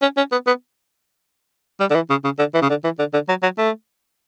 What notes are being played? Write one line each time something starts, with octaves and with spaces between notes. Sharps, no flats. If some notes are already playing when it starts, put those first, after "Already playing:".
C#4
C#4
B3
B3
G3
D3
E3
C#3
C#3
D3
E3
C#3
D3
E3
D3
D3
F#3
F#3
A3